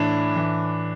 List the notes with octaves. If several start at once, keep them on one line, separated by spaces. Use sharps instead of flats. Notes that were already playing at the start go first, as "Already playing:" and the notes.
Already playing: A2 E3 D4
A2 E3